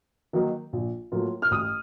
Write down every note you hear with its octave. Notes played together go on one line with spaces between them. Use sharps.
D#3 F#3 A#3 D#4
A#1
A2 F#3 A#3 F4
F6
A1 D#6